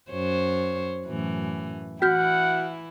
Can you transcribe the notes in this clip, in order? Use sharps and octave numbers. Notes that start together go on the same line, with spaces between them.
F#2 C5 C#5
F#2 A2 E3
E3 E4 F#4 F#5 F6 G6